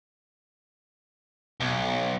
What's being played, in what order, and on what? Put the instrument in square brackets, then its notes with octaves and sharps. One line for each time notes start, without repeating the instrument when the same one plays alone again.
[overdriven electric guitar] B1